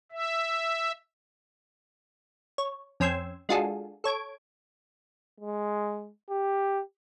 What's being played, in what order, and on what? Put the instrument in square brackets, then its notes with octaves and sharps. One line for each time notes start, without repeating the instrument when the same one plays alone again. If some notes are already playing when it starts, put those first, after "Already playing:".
[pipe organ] E5
[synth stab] C#5
F2 C#4 G5 C6 E6 G#6
G#3 D4 F4 F#4 G#4 A4
A4 C#5 G#6 D7
[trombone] G#3
G4